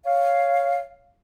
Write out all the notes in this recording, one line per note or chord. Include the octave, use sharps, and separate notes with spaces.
C#5 F5